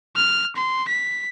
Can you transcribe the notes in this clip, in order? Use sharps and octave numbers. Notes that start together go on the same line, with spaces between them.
F6
C6
B6